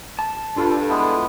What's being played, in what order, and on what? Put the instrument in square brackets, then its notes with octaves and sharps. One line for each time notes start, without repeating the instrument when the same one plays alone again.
[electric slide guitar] A5
[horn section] G2 [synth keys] D4 F4 A4
[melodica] G#3 B3 E4